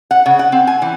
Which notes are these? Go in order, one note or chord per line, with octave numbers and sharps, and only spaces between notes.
F#5
C#3
F#5
C4
G#5
E3